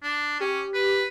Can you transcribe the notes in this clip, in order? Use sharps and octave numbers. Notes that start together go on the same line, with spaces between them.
D4
C#4 G4
B4